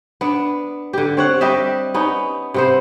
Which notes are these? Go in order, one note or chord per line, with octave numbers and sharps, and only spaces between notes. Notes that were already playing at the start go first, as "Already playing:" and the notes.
B3 D4
D3 G4
C4 C#5 F#5
G3 G4 D#5 E5
B3 C#4 D#4
C3 B3 C5